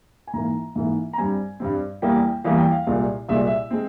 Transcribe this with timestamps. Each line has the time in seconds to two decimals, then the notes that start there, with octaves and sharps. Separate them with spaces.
0.27 G#5
0.33 G#2 E3 A#3 A#5
0.76 G#2 E3 A#3
1.13 A#5
1.18 G2 G3 C4 G#5
1.60 G2 G3 C4
2.02 E2 E3 G3 A#3 G5
2.44 E2 E3 G3 A#3 F5
2.58 G5
2.72 F5
2.87 C2 A#2 G#3
3.29 C2 A#2 G#3 E5
3.47 E5
3.70 G#3 C4